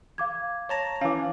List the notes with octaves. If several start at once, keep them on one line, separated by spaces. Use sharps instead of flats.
F5 D6 G#6
C#5 A5 A#5
E3 C#4 F5 D6